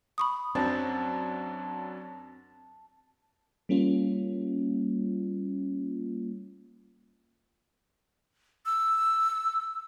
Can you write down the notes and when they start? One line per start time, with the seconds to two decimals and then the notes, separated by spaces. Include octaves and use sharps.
0.18 B5 C#6 D#6
0.55 F#2 F#3 C4 D4 A5
3.69 G3 A#3 C#4 F4
8.66 E6